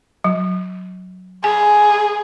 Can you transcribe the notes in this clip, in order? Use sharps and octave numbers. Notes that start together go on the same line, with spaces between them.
F#3
G#4 G#5